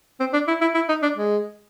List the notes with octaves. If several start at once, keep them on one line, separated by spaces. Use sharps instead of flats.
C4
D4
E4
E4
E4
D#4
D4
G#3